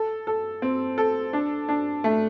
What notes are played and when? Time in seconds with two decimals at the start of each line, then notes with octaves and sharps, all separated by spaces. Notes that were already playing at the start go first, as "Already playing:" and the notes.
Already playing: A4
0.27 A4
0.62 C4
0.98 A4
1.33 D4
1.69 D4
2.04 A3